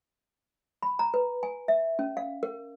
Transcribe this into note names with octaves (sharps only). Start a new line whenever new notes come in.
B5
A#5
B4
G#5
E5
C#4
F5
A#4